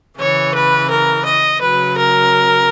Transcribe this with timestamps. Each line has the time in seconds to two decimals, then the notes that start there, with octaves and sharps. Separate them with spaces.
0.19 C#3 E3 C#5
0.54 B4
0.90 A#4
1.25 D#5
1.61 C#3 F#3 B4
1.96 A#4